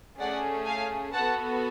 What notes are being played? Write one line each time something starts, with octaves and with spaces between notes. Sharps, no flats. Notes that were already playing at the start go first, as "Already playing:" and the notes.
A3 C#4 G#4 D5 F#5
F5 G#5
B3 F#4 A4 F#5 A5